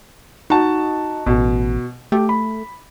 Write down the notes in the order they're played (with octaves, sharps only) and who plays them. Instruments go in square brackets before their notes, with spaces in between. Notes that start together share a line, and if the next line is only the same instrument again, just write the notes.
[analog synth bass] D#4 [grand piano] F#4 A5
[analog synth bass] A1 [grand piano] B2
[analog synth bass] A3 [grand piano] G4
[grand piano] B5